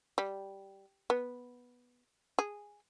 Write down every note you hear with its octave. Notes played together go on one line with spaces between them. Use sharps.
G3
B3
G#4